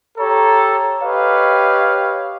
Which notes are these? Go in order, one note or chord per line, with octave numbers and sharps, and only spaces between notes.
G4 A4 C#5 A#5
G4 B4 C#5 D#5 F5